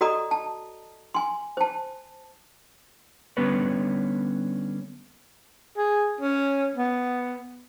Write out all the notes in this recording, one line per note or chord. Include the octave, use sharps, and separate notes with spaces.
F#4 A4 D5 D#5 A#5 D#6
A5
G#5 C6
C5 A5
D3 G3 B3 C#4 B4 C#5
G#4
C#4
B3